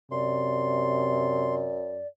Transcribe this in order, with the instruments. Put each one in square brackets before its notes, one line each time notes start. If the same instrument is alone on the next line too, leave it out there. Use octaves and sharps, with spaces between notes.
[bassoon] F#2 [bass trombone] C3 [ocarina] D5 [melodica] C6